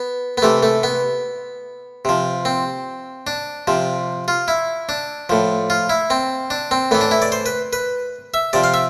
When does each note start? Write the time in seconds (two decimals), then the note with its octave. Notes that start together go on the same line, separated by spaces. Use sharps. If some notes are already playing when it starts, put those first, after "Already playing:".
Already playing: B3
0.38 B3
0.42 C3 E3 A3
0.63 A3
0.83 B3
2.05 C3 F3
2.45 C4
3.27 D4
3.67 C3 F3
4.28 F4
4.48 E4
4.89 D4
5.29 A2 F3
5.70 F4
5.90 E4
6.10 C4
6.50 D4
6.71 C4
6.91 A2 E3 B3
7.01 D4
7.11 E4
7.22 D5
7.32 C5
7.46 B4
7.73 B4
8.34 E5
8.53 C3 F3 D5
8.64 F5
8.74 E5